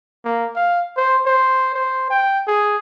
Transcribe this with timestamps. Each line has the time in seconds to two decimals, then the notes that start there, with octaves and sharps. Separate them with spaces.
0.25 A#3
0.56 F5
0.97 C5
1.26 C5
1.74 C5
2.10 G5
2.47 G#4